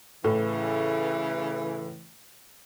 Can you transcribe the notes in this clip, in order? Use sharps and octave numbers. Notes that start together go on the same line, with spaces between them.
A2 C#3 E3